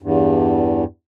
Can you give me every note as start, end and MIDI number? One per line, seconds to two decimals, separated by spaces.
0.02 0.84 40
0.02 0.84 43